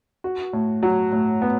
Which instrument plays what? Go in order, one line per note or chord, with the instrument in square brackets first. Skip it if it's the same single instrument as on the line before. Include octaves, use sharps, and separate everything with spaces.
[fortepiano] F#4
A2
F#3
A2
B3